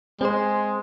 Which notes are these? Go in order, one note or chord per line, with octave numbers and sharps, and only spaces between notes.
G#3 C4 G#4 C5